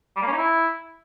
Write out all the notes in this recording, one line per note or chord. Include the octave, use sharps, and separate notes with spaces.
G3
A#3
C#4
D#4
E4